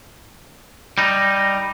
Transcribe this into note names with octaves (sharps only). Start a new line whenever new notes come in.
G3 D#4